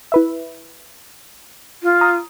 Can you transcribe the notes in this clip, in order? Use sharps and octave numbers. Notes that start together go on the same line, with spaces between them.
E4 B4 E5
F4
A#5 D#6